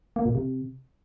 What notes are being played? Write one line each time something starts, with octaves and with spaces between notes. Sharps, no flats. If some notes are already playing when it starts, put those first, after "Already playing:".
A#3
A#2
C3